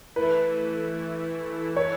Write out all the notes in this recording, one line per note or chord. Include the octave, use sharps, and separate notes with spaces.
E3 A3 E4 B4
C#5